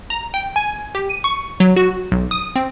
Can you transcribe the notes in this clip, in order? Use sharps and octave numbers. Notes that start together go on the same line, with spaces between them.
A#5
G5
G#5
G4
D#7
C#6
F#3
F#4
B1
D#6
C4